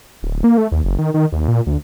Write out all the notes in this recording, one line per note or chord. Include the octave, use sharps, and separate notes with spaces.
D1
A#3
A3
D#2
F#1
D#3
D#3
D#2
A#2
D2